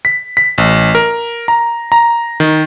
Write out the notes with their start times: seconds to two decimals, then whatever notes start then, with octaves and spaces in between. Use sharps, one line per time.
0.05 B6
0.37 B6
0.58 A1
0.95 A#4
1.48 A#5
1.92 A#5
2.40 D#3